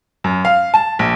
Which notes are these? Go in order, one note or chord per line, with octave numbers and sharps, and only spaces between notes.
F#2
F5
A5
A#1